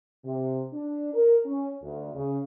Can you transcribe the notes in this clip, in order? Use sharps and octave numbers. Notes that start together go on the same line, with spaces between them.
C3
D4
A#4
C#4
D2
C#3